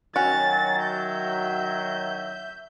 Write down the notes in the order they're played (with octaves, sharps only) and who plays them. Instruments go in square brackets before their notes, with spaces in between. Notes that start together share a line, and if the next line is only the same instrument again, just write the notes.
[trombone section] D#3 F#3 [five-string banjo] C#4 F#4 [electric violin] A6
[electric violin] E5 G6